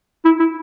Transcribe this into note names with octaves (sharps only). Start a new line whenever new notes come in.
E4
E4